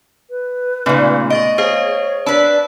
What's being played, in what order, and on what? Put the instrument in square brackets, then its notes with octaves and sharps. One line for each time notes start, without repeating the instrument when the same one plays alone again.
[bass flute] B4
[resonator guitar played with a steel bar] A#2 C#3 [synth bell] A3 B3 D#4
[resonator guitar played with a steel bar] D#5 [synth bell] C#6 A6 D7
[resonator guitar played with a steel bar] G#4 [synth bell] C5 D#5 F5 [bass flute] C#5
[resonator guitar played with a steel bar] D4 B4 [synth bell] A5 B5 E6